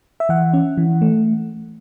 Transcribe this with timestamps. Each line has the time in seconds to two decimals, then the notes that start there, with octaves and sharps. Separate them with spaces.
0.20 E5
0.29 E3 F#5
0.53 C#4
0.78 E3
1.02 A3